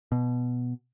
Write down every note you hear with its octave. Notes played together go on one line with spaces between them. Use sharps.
B2